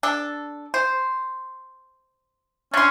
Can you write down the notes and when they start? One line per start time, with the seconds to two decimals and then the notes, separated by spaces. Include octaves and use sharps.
0.03 D4 A4
0.74 C5
2.74 C#4 D4 C6